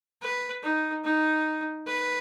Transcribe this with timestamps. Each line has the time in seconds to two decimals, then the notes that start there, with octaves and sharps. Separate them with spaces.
0.22 B4
0.63 D#4
1.04 D#4
1.87 B4